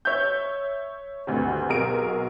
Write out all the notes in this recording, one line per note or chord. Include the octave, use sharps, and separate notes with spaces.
C#5 E5 E6 G6
G#1 D2 G2
B1 F#4 G#4 A#4 F5 D7